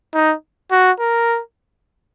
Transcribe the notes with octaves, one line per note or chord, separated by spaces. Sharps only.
D#4
F#4
A#4